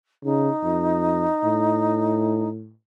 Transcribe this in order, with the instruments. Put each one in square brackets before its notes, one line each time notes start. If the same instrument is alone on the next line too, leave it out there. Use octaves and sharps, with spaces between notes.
[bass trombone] C#3 [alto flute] D#4
[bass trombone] F2
A2